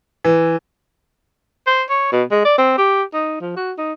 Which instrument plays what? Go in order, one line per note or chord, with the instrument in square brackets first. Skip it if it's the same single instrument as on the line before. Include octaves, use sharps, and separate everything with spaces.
[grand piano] E3
[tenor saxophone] C5
C#5
B2
G#3
D5
C4
G4
D#4
F3
F#4
D#4